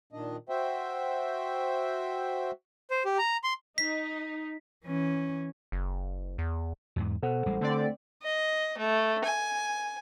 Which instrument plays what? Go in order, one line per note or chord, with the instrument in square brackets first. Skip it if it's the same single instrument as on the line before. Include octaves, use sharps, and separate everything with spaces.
[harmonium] A#2 D#3 D4 D#5
F#4 C5 E5 G5
[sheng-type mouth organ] C5
G4
A#5
C6
[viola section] D#4 [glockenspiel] B6
[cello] E3 C#4
[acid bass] F#1
E2
[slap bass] E2 G#2
[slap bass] B2 [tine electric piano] A4 C5 F#5
[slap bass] A1 G3 G#3
[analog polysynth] D3 C4 D5 [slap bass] A3
[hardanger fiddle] D#5
A3
G#5